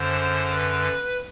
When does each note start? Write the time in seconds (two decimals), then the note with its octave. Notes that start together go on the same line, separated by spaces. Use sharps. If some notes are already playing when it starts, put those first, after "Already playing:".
Already playing: F#2 D3 C5
0.50 B4